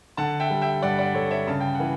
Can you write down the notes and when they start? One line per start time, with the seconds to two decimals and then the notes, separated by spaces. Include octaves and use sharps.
0.17 D3 F#5 A5
0.40 E5 G5
0.50 G3
0.62 E5 G5
0.82 G2 D5 F#5
0.98 D5 F#5
1.14 G2 A4 C#5
1.31 C#5 E5
1.47 C#3 A5
1.60 G5
1.75 F#5
1.80 E3